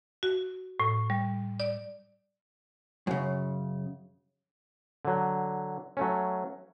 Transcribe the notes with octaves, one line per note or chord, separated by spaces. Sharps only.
F#4
A2
G3
D5
F#2 C#3
D3 F#3
F#3 A3 C#4